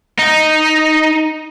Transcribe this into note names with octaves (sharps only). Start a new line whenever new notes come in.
D#4